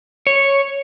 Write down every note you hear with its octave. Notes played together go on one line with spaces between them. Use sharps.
C#5